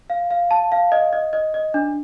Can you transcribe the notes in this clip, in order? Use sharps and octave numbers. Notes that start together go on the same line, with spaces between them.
F5
F5
A5
F5
D#5
D#5
D#5
D#5
D4